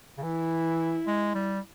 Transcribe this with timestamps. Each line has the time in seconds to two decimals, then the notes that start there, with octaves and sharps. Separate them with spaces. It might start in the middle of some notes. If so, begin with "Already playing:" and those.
0.18 C#3
0.23 E3 E4
1.07 G#3
1.35 G3